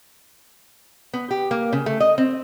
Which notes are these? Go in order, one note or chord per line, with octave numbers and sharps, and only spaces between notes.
B3
G4
A#3
C#3
A3
D#5
C4